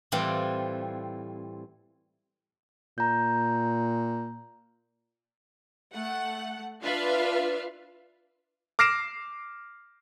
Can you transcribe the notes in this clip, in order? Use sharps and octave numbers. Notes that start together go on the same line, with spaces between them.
A2 E3 G3 C4 F4 F#5
A#2 A#5 G6
A3 F#5
D4 F4 B4 E5 F5
D6 F6 A#6 C7 D7 E7